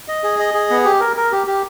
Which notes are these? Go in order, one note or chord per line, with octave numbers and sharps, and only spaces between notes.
D#5
G#4
D#5
G#4
B3
G4
A#4
A#4
G4
G4